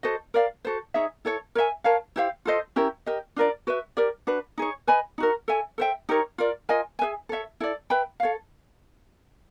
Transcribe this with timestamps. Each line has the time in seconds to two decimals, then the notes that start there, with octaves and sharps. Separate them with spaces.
0.03 F#4 A4 C5 D#5
0.34 A#4 D5 F5
0.65 F#4 A4 C5
0.94 D#4 G#4 C#5 E5
1.25 E4 A4 C#5
1.55 A#4 C#5 E5 G#5
1.84 A#4 C#5 F5 A5
2.16 E4 G4 C5 F5
2.45 F4 A4 C5 D#5
2.76 C#4 E4 G4 A#4
3.06 G4 A#4 D#5
3.36 D4 F4 A#4 D5
3.67 F#4 B4 E5
3.97 G4 A#4 D5
4.27 D4 F#4 B4
4.58 D#4 G#4 C#5
4.87 B4 D#5 G#5 B5
5.18 D#4 F#4 A#4
5.48 A4 C#5 E5 G#5
5.78 A4 C5 E5 G5
6.09 D#4 G4 A#4 C#5
6.38 F4 A#4 D5
6.69 F4 A#4 D#5 G#5
6.99 G#4 B4 E5 G#5
7.29 A4 C#5 E5
7.60 E4 A4 D5
7.90 B4 E5 G5 B5
8.20 A4 C#5 F5